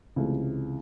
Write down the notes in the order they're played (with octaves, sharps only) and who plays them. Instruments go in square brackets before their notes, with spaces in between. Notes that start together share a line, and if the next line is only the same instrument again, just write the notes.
[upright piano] C#2 C3 E3 A3